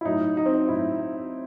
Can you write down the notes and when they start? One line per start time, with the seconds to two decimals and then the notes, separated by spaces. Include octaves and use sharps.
0.01 E4
0.05 A2 F#3 D#4
0.37 D#4
0.46 C4
0.54 D#4
0.69 A2 F#3 E4